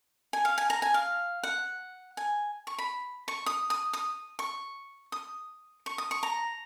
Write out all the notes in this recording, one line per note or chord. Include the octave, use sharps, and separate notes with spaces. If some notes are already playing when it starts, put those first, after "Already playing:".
G#5
F5
G#5
A#5
G#5
F5
F#5
G#5
C#6
B5
C#6
D#6
D#6
D#6
C#6
D#6
C#6
D#6
C#6
A#5